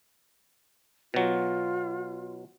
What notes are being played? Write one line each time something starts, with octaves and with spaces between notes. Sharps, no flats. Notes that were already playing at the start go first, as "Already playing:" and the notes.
B2 F#3 F4